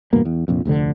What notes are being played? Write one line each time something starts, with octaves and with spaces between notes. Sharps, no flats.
E2 G2 B2 A#3
E2
F1 A#1 F2
F1 D2 B2 D3